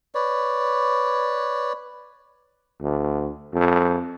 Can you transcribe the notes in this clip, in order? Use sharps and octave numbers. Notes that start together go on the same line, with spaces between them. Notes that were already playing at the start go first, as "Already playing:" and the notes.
B4 C#5 D5
D2
F2